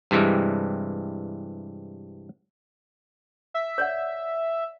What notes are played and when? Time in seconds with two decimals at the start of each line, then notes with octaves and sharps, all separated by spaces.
0.11 G2 C3 E3 G3 G#3
3.54 E5
3.78 C#5 D5 F#5